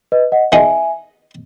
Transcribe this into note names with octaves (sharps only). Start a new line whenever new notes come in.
B4 D#5
D#5 F#5
B3 D#4 G#4 D#5 E5 G#5